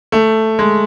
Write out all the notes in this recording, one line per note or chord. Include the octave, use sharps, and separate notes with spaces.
A3
G#3